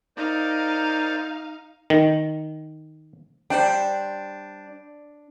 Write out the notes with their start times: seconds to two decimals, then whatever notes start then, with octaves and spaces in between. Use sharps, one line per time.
0.17 D#4 A#4 C5 D5 F5
1.90 D#3
3.50 G3 D4 C5 G5